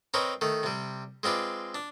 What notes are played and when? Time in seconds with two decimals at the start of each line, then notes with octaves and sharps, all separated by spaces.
0.14 C4 D#4 A#4 B4 C#5
0.41 D#3 A3
0.63 C3 G3
1.23 G#3 C4 F4 B4 D5
1.75 D4